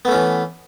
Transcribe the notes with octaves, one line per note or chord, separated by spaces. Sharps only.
E3 A3 B3 C#4